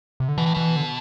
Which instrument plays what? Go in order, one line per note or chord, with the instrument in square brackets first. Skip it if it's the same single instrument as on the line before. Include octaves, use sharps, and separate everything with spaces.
[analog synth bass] C3
D3
[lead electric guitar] B2 [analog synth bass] E3
[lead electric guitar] A2
[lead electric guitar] B2 [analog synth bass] E3
[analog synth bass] D3